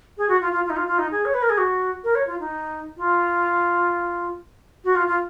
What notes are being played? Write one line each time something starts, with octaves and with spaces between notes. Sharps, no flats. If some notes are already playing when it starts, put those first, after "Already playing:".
G#4
F#4
F4
F4
F4
D#4
F4
F4
D#4
G#4
C#5
B4
A#4
G#4
F#4
A#4
C#5
F4
D#4
F4
F#4
F4
F4